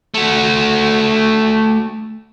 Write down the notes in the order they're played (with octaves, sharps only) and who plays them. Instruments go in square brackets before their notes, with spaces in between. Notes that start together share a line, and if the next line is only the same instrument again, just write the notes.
[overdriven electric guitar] A3 F#4